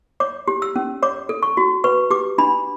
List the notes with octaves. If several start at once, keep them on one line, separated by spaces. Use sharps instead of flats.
C#5 D6
G4
E6
C#4
C#5 D6
A4
C#6
F#4
B4 C#6
G4 D6
D4 B5